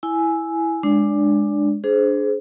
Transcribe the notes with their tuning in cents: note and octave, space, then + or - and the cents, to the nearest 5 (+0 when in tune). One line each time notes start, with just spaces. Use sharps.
E4 +0 G#5 +10
G#3 +0 D4 +10 D5 -25
D4 -5 G#4 +25 C5 -10